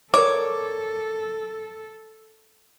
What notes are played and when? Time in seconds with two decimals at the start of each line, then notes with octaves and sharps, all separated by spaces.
0.14 A4 A#4 C#5 D5 A#5 D6